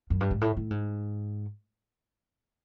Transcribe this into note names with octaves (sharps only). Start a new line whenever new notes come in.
F#2
G2
G#2
A2
A2
G#2